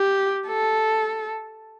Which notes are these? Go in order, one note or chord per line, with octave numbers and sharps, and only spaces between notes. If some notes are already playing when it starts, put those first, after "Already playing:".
Already playing: G4
A4